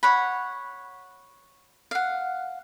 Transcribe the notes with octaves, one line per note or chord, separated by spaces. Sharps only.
C#5 F#5 B5
F5 F#5